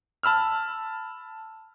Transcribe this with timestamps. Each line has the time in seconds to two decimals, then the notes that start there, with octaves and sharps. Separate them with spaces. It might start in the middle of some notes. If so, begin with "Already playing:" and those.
0.23 A5 B5 E6 F6